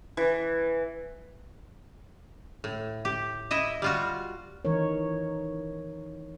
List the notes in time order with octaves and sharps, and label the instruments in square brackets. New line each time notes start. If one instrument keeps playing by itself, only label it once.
[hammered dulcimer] E3
[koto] A2
G4
E4 D#5 E5
G3 F4 F#4
[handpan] D#3 E3 D#4 A#4 C#5